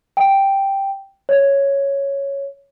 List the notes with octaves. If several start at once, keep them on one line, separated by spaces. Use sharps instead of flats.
G5
C#5